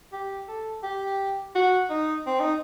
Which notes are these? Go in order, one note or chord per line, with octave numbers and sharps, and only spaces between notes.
G4
A4
G4
F#4
D#4
C4
D#4